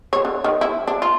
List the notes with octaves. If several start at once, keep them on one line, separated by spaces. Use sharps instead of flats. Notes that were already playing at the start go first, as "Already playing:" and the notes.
C#5
D3
D#3
E4
D4
F4